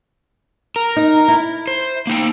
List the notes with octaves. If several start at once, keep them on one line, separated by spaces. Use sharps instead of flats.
A#4
D#4
E4
C5
A#3 D#4 G5